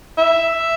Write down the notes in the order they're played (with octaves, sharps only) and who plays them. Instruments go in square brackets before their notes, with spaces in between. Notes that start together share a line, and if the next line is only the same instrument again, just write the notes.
[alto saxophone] E5